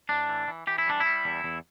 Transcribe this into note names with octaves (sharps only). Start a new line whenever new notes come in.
A2 D4
E3
E3
E3 G4
E4
G3 D4
E4
G3
E2
E2